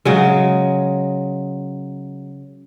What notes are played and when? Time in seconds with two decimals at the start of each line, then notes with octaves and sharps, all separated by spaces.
0.05 C#3 F#3 G#3